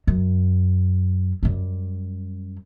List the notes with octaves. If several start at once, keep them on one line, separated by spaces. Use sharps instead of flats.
F#2
F#2 G3